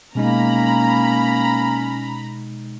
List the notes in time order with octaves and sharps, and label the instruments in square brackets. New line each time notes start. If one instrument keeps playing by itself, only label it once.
[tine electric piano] B2 G#3 D#4 [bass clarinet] A#3 [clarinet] C#4 [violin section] A#5 B5